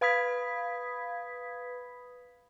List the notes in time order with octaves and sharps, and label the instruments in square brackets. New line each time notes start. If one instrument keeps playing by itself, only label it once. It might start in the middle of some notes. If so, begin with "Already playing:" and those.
[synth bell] B4 F5 B5 D#6 G#6 B6